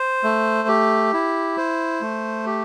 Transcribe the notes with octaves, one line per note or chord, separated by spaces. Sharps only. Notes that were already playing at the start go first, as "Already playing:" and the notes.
Already playing: C5
A3
G4
E4
C5
A3
G4